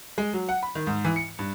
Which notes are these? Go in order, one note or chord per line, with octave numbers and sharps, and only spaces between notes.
G#3
F#3
F#5
B5
D#3
G#2
E3
C#7
G2